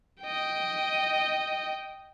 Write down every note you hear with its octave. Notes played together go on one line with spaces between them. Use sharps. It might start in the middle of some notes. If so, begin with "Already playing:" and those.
D#5 G5